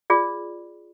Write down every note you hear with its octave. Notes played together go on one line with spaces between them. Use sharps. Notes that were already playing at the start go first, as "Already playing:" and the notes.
F4 G#4 D5